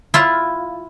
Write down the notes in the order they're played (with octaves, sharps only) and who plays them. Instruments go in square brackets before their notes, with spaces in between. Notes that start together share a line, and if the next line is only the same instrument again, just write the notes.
[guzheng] E4 F4